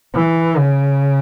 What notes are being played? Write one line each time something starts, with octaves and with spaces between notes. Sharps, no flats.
E3
C#3